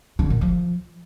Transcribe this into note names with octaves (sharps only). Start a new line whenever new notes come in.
D3
A#2
F3